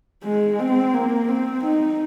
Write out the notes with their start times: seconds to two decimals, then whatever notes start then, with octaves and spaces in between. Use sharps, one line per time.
0.24 G#3
0.59 C4
0.94 A#3
1.29 C4
1.64 D#4